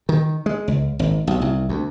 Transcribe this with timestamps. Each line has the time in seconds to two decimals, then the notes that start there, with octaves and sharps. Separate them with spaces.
0.09 D#3
0.46 G#3
0.68 C#2
0.99 G#1
1.27 B1
1.41 C2
1.69 D2